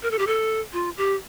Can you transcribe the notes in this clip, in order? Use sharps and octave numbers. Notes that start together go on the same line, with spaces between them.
A#4
A4
G4
A4
F4
G4